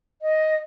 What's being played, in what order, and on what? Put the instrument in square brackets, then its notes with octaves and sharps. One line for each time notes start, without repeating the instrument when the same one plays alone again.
[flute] D#5